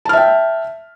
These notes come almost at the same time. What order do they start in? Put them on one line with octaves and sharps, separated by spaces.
A5 F6 E5 G5